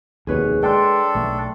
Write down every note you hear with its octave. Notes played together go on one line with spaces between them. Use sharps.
F1 D#2 B2 G#4 B4 C#5
G#3 D4 A4 G5 C6
B1 A3